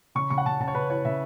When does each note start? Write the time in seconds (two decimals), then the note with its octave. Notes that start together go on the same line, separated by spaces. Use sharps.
0.15 C#3 C#6
0.30 C#3 C#6
0.38 F#5
0.46 C#3 A5
0.60 C#3 A5
0.68 C#5
0.75 C#3 B4
0.90 E4 C#5
1.05 C#3 E5